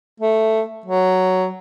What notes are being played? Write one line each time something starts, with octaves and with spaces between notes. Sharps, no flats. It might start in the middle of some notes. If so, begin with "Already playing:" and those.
A3
F#3